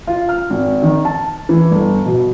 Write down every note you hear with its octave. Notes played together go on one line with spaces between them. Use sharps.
F4
F6
G#1
D#3
A5
E3
G1
B2